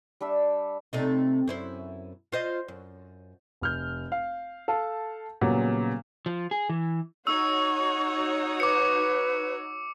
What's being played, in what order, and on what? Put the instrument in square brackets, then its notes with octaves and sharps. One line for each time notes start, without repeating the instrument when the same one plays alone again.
[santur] G3 D4 E5 E6
[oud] C3 A3 D#4
F#2 E4 C5
F4 C5 D#5
F#2
[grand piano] F1 F6 G6
F5
A4 F5 A5
A#2 C#3 F#3 G3 B3
[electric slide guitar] F3
G#4
E3
[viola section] D#4 F#4 C#5 [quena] C#6 [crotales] E6
[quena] B4 [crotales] D6 C#7